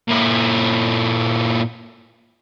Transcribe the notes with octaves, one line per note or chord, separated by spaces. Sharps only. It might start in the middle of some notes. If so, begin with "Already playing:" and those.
A#2 E4